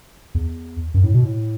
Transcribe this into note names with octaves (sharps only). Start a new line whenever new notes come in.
E2
F#2
A2
B2
A2